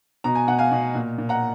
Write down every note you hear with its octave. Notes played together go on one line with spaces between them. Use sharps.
B2 A#5
G#5
B2 F#5
F5 G#5
B2
A#2
A#2
F#5 A#5